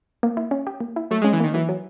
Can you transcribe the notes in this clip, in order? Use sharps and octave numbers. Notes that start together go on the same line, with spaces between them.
A#3
E4
C#4
G4
A#3
E4
F#3 A3
G#3
C#4
E3
D#3 A#3
E3 F#3
F#3